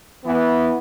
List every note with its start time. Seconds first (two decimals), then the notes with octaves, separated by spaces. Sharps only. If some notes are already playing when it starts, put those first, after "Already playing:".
0.24 E3 B3